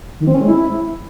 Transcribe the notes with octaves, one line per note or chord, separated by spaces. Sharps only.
D#3
C4
C#4
G#3
E4